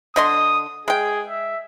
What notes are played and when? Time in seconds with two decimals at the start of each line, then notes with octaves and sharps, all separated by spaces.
0.16 D3 D#5 C6 D#6
0.88 G#3 G#4 G5
1.28 E5